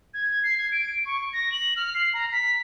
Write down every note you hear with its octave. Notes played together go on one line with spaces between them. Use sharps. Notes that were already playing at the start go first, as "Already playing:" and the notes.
G#6
C7
G#6
D7
C#6
A#6
F#7
F6
C7
A#5
B6